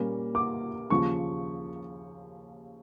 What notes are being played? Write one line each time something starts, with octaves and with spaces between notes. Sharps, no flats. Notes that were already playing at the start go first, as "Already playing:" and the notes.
Already playing: A#2 G3 A#3 C#4
D6
D#2 C#3 F3 C#6